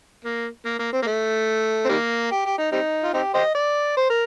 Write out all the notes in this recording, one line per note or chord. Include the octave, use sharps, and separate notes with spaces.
A#3
A#3
A#3
C4
A#3
A3
C4
D#3 G3 A#3
G4
G4
D#4
G3 C4 D#4
F4
C4 D#4 G4
G4 C5 D#5
D5
C5
A#4